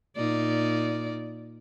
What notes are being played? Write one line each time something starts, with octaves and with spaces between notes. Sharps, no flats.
A#2 D#4 D5